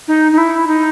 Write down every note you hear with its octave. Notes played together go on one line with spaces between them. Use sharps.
D#4
D#4
E4
D#4